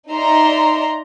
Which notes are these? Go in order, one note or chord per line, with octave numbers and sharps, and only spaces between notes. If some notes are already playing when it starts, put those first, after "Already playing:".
D#4 D5 E5 A#5 C6